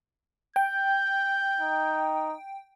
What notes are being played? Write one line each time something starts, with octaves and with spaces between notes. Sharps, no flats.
G5 G6
D#4